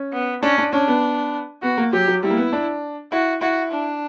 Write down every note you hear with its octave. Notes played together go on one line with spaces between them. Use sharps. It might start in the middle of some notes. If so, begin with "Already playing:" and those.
Already playing: C#4
B3
C#4 D4
D4
C#4 D4
B3
B3 F#4
A#3
F#3 G4
F#3
G3 E4
A#3
B3
D4
E4 F#4
E4 F#4
D4